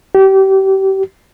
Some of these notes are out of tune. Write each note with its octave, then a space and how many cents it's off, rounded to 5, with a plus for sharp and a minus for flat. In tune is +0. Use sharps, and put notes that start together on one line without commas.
G4 -30